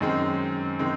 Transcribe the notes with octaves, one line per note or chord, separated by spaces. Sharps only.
F#2 D#3 G#3 C4
D#3 G#3 C4